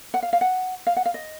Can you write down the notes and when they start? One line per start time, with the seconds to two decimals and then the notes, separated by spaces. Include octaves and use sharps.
0.14 F#5
0.23 F5
0.33 F5
0.41 F#5
0.87 F5
0.96 F#5
1.06 F5
1.14 D#5